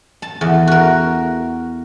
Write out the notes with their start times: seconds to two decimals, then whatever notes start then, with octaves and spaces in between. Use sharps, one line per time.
0.22 A5
0.41 E2
0.67 F#4 A#4